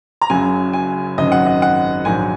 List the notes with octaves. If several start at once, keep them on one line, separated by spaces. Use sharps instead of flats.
A#5
F#1 F#2 C#3 F#3 G#5
G#5
G#1 F#2 C#3 F#3 D#5
F#5
D#5
F#5
A#1 G#2 D#3 F#3 G#5